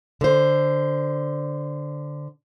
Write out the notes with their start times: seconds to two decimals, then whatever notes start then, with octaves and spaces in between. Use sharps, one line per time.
0.21 D3 C5